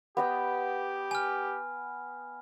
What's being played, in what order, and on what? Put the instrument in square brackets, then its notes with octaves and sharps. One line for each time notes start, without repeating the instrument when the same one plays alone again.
[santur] B3 D#5 G5 [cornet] G4
[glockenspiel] G#5 F6